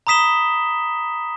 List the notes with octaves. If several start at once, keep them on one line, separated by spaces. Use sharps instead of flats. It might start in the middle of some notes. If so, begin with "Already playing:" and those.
A#5 B5 D#6 B6 E7 G7